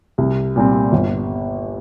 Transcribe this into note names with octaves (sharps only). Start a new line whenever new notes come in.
C2
A#2 G3 C4
G1